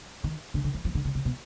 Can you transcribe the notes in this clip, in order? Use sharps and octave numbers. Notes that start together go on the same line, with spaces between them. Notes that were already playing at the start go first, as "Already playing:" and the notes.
D#3
D3
D3
F3
F3
D3
C#3
C3
B2